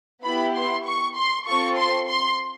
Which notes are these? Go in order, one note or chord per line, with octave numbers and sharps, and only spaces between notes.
B3 E4 G4 B5
C6
C#6
C6
C4 F4 A4 C#6
C6
C6